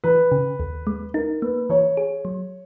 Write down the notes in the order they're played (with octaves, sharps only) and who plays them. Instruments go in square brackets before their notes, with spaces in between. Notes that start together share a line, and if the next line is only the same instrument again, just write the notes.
[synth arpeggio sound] E3 [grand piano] B4
[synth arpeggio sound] C#3
D#2
G#3
[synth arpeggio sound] D#4 [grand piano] A#4
[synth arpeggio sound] A#3 [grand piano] B4
[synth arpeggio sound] E3 [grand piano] C#5
[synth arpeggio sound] G#4
F#3